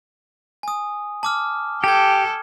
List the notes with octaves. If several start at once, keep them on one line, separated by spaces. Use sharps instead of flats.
G#5 D#6
A5 D6 F6
G4 A4 G5 A5 G#6